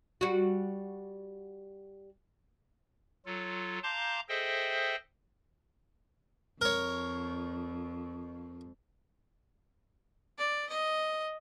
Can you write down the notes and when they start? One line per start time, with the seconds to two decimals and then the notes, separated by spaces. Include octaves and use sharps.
0.21 G3 F#4
3.26 F#3 F4 A4
3.83 F5 A5 A#5 C6 D6 G6
4.29 G#4 A4 C5 D#5 E5 G5
6.61 F2 A#4 C#5
10.38 D5
10.69 D#5